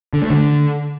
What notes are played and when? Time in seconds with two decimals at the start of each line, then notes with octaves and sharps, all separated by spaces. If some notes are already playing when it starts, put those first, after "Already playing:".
0.13 D3
0.22 A3
0.30 D3